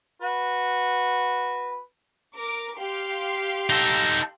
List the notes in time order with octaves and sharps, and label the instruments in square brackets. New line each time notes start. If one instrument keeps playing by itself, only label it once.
[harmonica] F#4 B4
[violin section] A#4 D6
G4 F5 C6
[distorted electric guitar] D#4 A4